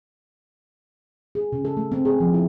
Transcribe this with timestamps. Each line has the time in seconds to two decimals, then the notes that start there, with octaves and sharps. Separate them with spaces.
1.35 G#4
1.52 C#3
1.65 A4
1.77 A3
1.92 C4
2.05 G#4
2.20 F3
2.34 E4